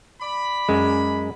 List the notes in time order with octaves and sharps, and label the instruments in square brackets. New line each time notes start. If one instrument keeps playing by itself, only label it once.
[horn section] D5 B5
[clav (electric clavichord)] F#2 G#3